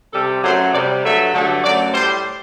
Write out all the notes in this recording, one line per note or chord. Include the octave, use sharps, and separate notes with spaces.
C3 G3 A4
F#2 F#3 A3 C5
C3 G3 D5
G2 F#3 A3 E5
G2 D3 F#3 A3
F#2 F#3 A3 D5
A2 G3 C5